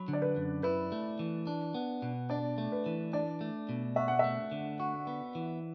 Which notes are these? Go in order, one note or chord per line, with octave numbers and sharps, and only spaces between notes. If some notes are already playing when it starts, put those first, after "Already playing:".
Already playing: F#3 B5
D3
D5
B4
F#2
E4 B4
A3
E3
D4
B3
B2
D4 D5
A3
B4
E3
D4 D5
A3
B2
F#4 E5
F#5
A3 E5
D3
F#4
B3
E3